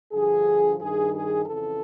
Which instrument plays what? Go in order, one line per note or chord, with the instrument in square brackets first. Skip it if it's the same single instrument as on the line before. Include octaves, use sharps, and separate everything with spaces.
[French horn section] G2 D3 F3 G#4
G2 D#3 G#4
G#4
F2 C#3 E3 A4